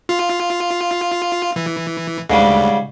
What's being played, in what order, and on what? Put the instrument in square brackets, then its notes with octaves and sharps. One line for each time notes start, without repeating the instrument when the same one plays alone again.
[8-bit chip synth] F4
E3
[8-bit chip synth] D2 [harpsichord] G#2 C#3 G3